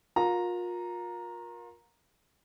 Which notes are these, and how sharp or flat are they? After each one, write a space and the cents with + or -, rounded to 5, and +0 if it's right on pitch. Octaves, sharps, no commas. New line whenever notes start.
F4 +35 A#4 +20 A#5 +0